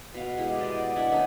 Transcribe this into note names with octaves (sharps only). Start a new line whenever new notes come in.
B2 F5
G#3 E4 G4
B3 D5 D#5
D5
D4 E4 E5 F#5
D#3 A3 C#4 D#4